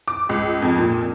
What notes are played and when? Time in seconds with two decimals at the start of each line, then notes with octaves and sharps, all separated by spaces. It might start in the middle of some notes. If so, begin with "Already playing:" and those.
0.08 D6
0.29 C#2
0.62 F2
0.78 A#2